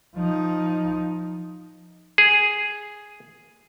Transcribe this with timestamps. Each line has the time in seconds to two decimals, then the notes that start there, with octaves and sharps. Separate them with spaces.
0.15 F3 D#4
2.18 G#4